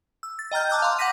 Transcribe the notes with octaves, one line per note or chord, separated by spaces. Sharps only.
E6
A6
D#5 G5 A#5 F6 G6
A5 A#5 D6 E6 F#6 G6
F5 C6
F#5 D6 G6 A#6 B6 D#7